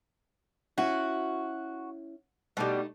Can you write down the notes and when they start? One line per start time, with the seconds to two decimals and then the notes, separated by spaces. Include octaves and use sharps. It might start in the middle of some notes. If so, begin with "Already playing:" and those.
0.78 C#4 E4 F#4
2.57 B2 G3 A3 D4 D#4